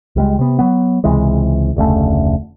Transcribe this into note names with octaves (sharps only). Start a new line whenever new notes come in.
C#2 G3 G#3
C3 B3
F#3 B3
C#2 C3 E3 G#3
F1 D2 C#3 A3